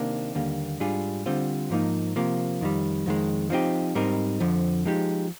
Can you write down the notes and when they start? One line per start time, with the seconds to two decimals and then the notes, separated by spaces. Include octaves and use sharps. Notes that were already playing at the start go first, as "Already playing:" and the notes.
Already playing: C3 D#3 A#3 D4
0.35 D#2 D3 G3 A#3
0.80 G#2 G3 D4 F4 G#4
1.26 D3 G3 C4 F4 C5
1.70 G#2 F3 A#3 D#4
2.16 C3 F3 A#3
2.61 F2 D#3 G3
3.06 F2 D#3 G#3
3.50 F3 C4 D#4 G4
3.95 G#2 G3 C4 D#4 A#4
4.40 F2 D3 F3
4.86 F3 G#3 D#4 G4